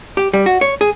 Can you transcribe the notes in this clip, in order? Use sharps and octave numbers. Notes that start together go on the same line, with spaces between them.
G4
G3
F#4
C#5
G#4